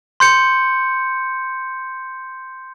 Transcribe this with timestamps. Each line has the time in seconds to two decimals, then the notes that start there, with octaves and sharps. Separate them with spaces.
0.20 C6 G6 C#7